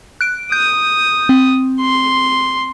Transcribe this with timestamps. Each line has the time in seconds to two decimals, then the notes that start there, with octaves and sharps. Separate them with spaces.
0.21 F#6 D7
0.52 D#6 G6
1.29 C4
1.81 C6